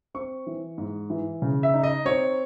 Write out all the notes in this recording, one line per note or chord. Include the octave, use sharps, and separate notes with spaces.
C4 C#6
E3
G#2
E3
C#3
E5
D#4
D#5
C4 C#5